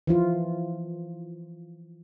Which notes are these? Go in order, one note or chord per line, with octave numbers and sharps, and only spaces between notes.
E3 F3 F4